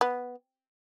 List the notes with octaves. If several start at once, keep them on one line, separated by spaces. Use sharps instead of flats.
B3